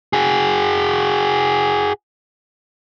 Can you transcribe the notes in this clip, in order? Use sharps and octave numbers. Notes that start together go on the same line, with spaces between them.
F#4 G#4